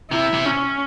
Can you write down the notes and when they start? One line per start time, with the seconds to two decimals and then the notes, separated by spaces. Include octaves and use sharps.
0.11 C3 E4
0.34 C3
0.46 C#4